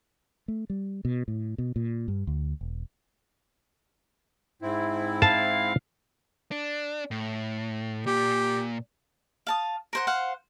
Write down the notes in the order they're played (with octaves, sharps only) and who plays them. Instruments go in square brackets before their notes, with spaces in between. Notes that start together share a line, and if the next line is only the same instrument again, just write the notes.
[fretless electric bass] A3
G3
B2
A2
B2
A#2
G2
D2
E1
[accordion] G#2 C4 E4
[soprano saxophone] F5 [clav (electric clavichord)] A5
[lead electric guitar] D4
A2
[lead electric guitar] A#2 [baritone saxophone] G4
[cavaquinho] F5 A5 D#6
A#4 C5 F#5
C5 F5 F#5